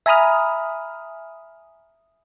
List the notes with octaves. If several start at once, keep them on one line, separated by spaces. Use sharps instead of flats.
E5 G#5 A#5 B5 D#6 F6